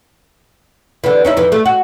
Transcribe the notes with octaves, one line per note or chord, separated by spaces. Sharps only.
D3 E3
C#4 D#4 E4
F2 E3
A3
F#4